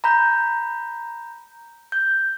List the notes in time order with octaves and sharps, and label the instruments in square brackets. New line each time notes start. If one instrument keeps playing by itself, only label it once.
[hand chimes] A#5 B5 G6
G6